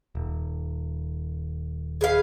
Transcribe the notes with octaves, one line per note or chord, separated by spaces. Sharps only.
D#1
G#4 B4 F5